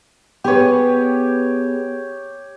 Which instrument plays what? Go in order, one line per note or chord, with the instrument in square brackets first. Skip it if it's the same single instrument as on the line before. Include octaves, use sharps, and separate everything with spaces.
[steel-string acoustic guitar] B3 G#4 B4 [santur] G4 C#5